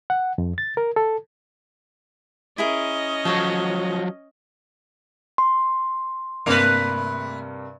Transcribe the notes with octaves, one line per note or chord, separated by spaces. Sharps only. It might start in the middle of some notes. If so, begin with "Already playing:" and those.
F#5
F2
A6
A#4
A4
C#4 E4 G#4 A#4 D#5
F3 F#3 A4 C#5
C6
G2 C3 A3 A#3 B4